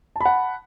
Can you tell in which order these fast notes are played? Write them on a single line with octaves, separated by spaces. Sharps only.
A5 B5 F#5